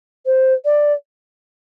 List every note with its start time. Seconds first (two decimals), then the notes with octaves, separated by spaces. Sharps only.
0.25 C5
0.64 D5